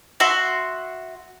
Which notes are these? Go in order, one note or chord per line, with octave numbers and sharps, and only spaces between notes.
F#4 E5 C6